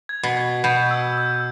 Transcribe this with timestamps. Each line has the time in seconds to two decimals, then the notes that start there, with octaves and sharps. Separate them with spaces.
0.09 G#6
0.23 B2
0.37 G#6
0.64 B2 G6
0.91 E6
1.18 E6